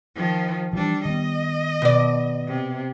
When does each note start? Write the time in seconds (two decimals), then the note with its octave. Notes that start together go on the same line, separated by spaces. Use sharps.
0.15 D#3 F3
0.73 E3 F3 G3 D4
1.05 D#3 B3 D#5
1.82 B2 D5
2.48 C3